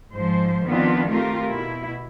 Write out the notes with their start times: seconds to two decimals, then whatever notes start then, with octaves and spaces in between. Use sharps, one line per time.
0.14 G#2 F3 C5
0.65 D#3 F3 B3 C4 D4 F4
1.08 A3 C4 F4 G4 A#4
1.51 B2 E4